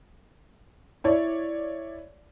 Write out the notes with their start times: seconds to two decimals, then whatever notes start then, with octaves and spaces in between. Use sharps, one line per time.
1.04 E4 C#5 D5